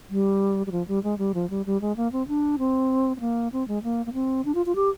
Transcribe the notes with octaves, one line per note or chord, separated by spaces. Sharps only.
G3
G3
F3
G3
G#3
G3
F3
G3
G3
G#3
A#3
C4
D4
C4
C4
A#3
C4
G#3
A#3
A#3
C4
D4
F4
F4
G4